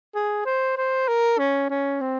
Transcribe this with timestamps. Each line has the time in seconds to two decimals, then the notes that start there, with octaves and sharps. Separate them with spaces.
0.15 G#4
0.45 C5
0.77 C5
1.08 A#4
1.38 C#4
1.70 C#4
2.01 C4